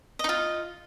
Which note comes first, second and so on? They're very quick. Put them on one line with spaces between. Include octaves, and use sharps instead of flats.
D#5 D#4 F4